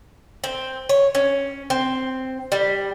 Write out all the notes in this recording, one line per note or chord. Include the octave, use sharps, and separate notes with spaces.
C4
C#5
C#4
C4
G3